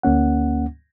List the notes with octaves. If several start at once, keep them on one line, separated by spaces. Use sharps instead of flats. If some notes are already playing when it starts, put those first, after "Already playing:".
D2 A#3 C#4 F#5